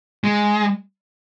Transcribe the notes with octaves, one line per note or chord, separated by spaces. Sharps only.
G#3